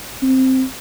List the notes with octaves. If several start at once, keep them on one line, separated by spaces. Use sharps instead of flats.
C4